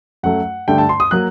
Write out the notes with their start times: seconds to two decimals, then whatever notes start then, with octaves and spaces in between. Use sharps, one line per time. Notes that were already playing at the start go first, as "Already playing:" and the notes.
0.23 F#2 F#3 A3 F#5
0.68 G2 D3 A3 G5
0.78 A5
0.89 C6
1.00 D#6
1.11 F#3 A#3 F#6